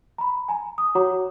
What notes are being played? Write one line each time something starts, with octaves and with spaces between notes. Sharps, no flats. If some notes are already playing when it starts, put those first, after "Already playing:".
A#5 B5
G#5 A#5
D#6
F#4 C#5 F#5 A#5 D6